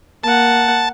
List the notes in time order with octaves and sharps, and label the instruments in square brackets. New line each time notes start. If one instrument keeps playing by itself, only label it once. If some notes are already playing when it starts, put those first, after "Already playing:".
[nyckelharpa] A#3 F#5 [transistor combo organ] A5